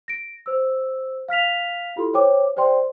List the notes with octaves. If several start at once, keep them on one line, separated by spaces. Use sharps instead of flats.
A#6 D7
C5 E6
F5 F6 B6 F7
E4 F4 G4 A4 C6
C5 C#5 G5 D6
G4 C5 D5 G5 C6